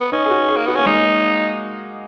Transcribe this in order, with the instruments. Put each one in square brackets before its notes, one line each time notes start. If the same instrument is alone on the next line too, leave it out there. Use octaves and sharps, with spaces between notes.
[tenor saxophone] B3
[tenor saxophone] C#4 [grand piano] D#4
[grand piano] G#4
F#4
G#4
[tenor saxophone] A#3
[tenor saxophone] B3 [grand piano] F#4
[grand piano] A#3 [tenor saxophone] C#4
[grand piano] G#3 [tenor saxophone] D#4